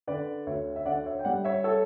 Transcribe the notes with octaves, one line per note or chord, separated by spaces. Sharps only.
D3 B4 D5
D2 C#5 E5
E5
D3 D5 F#5
C#5 E5
G5
G3 D5 F#5
C#5 E5
A4 C#5